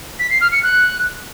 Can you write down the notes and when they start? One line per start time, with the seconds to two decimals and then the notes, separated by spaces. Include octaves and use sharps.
0.19 B6
0.30 C7
0.41 F6
0.52 C#7
0.63 F#6